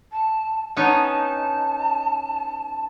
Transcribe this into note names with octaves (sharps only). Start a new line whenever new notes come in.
A5
B3 C#4 D#4 A5